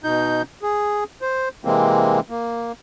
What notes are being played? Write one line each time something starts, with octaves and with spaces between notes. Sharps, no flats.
B2 D#4 G6
G#4
C5
C3 E3 G#3 A#3 C4
A#3